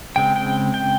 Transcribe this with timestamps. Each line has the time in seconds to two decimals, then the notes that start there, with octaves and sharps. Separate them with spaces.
0.16 C#3 G#3 C4 G5
0.36 G5
0.74 G5